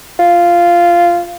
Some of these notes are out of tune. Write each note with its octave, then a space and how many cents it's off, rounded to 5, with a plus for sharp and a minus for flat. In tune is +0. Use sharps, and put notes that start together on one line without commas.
F4 -10